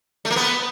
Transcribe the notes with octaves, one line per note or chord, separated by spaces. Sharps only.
A3
A#3
B3